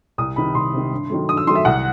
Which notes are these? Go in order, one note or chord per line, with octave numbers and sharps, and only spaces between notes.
C2 D#6
C3 D#3 B5
C2 C6
C3 D#3
G2
D#3 F#3 A3
G2 D#6
E6
D#3 F#3 A3 C6
E5
C2 F#5